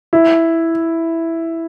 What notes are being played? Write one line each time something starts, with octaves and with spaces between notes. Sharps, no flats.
E4